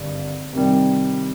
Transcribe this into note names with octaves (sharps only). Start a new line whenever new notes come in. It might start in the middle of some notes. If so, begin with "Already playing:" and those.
Already playing: G#1 G2 D3
C3 D#3 G3